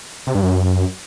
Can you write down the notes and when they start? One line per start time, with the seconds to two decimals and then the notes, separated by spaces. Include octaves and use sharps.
0.27 C3
0.35 G2
0.43 F#2